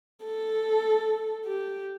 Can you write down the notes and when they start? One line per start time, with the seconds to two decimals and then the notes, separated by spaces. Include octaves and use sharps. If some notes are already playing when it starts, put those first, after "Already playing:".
0.24 A4
1.45 G4